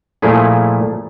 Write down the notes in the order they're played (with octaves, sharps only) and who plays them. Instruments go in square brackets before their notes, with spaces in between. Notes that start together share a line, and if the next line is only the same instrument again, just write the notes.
[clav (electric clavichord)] A#2 F3 A3 E4 G#4